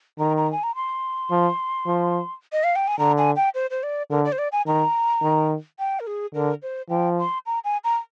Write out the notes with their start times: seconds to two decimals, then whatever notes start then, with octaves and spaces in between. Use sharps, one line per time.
0.19 D#3 A#5
0.37 A#5
0.52 G#5
0.63 A#5
0.75 C6
1.31 F3
1.87 F3
2.52 D#5
2.64 F5
2.76 G5
2.88 G#5
2.99 D3 A#5
3.18 G#5
3.36 G5
3.55 C5
3.70 C5
3.83 D5
4.10 D3 A#4
4.25 D5
4.32 C5
4.38 D5
4.52 G#5
4.66 D#3 A#5
5.22 D#3
5.79 G5
6.00 A#4
6.07 G#4
6.34 D3 A#4
6.63 C5
6.90 F3 G5
7.19 C6
7.46 A#5
7.64 G#5
7.84 A#5